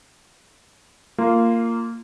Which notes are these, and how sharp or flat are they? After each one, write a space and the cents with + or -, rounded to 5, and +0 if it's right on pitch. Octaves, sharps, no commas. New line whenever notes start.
A#3 -15 F4 -15